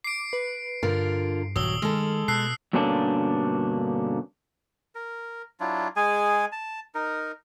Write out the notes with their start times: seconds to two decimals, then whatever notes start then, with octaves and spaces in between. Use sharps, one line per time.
0.04 D6 C7 D7
0.33 B4
0.83 G2 D3 F4 A#4
1.56 D#1 F#3 D#6 E6 G7
1.82 D#3 G#3 A4 F6
2.28 B2 A5 E6 F#6 G6 C7
2.73 G2 B2 D3 A#3 C#4 D4
4.95 A#4
5.60 F#3 D4 E4 F4
5.96 G#3 G#4 G#5
6.52 A5
6.95 D#4 A#4